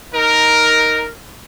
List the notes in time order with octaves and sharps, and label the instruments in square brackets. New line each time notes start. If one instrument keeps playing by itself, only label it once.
[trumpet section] D#4 A#4